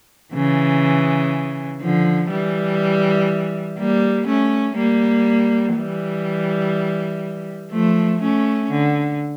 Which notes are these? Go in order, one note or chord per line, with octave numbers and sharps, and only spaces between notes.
C#3 E3
D3 F3
E3 G3
G3 A#3
A3 C#4
G3 A#3
E3 G3
F3 A3
A3 C#4
D3